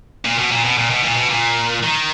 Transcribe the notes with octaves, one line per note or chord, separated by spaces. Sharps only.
A#2
B2
A#2
B2
A#2
B2
A#2
B2
A#2
D#3